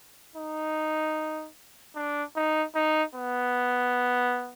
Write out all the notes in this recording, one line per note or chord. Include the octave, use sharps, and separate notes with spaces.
D#4
D4
D#4
D#4
B3